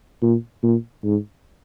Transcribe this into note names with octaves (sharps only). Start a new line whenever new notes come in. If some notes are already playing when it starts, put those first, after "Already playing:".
A#2
A#2
G#2